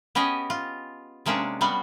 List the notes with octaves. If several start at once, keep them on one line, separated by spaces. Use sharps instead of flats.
B3 C#4 G4 G#4 D#5
F4
C3 G#3 A#3 C#4 D4
G3 B3 F#4 F5